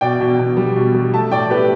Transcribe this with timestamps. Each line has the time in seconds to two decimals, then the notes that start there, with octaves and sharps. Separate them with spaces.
0.01 B2 D5 G5
0.20 B2
0.39 B2
0.57 G3
0.76 B2
0.95 G3
1.13 A3 E5 A5
1.31 A2 D5 G5
1.50 A3 G4 B4